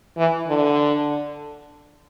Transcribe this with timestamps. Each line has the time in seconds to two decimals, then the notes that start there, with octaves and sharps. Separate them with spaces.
0.17 E3
0.48 D3